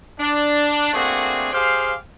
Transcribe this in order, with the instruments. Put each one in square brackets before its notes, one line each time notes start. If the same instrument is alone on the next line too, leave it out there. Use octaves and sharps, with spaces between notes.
[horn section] D4
A3 A#3 C4 D4 F#4 G#4
G4 G#4 C5 F5